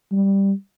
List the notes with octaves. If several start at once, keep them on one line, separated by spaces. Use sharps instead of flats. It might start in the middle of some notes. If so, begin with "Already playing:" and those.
G3